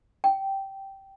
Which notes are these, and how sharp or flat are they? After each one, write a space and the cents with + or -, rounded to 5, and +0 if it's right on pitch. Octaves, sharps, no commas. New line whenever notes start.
G5 -10